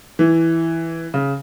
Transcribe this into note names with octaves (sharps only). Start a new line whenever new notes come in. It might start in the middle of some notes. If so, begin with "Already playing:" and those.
E3
C#3